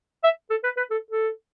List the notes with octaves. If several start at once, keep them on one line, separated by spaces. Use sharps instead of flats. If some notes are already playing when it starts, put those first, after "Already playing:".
E5
A4
B4
B4
A4
A4